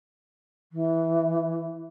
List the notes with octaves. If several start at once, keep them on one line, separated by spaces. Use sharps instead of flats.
E3